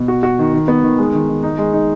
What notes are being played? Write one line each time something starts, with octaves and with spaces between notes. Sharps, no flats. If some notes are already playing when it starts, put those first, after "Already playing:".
Already playing: B2
F#4
F#4
D#3
D#3
B3
D#3
G#3
D#3
D#3
D#4
G#3
D#4